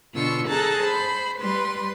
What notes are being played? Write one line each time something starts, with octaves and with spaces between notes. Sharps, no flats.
B2 D3 F4 C#6 E6
G#4 A4 A5 A#5 F#6
C5 B5
G3 B4 C6